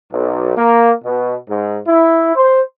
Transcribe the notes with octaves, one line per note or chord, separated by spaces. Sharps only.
B1
A#3
B2
G#2
E4
C5